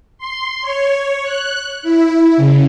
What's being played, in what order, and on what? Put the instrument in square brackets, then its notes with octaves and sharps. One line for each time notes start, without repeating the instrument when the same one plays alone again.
[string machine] C6
C#5
F#6
E4
C#3